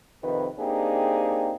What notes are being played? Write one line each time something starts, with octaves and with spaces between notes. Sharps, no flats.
F2 C3 D#3 B4
A#3 C4 D4 D#4 G4 G#4